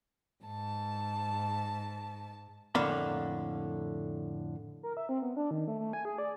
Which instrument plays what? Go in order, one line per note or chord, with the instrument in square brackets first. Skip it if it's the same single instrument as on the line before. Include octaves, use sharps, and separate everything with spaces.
[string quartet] G#2 A5
[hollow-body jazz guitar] F2 A2 D3 A#3 F5 B5
[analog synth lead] A#4
E5
C4
B3
D4
D#3
A3
A3
G#5
G#4
D5